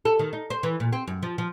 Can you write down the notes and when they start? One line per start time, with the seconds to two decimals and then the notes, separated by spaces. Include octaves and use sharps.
0.05 A4
0.19 D#3
0.33 D#4
0.50 C5
0.63 E3
0.80 A#2
0.93 C4
1.07 F#2
1.23 F3
1.38 F3